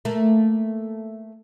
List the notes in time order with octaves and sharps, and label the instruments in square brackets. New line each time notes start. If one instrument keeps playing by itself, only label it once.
[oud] A3 A#3